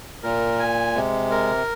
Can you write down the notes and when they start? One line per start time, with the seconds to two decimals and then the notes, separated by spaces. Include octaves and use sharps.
0.23 A#2 A#4
0.59 G#5
0.95 C3 G#3
1.31 A#4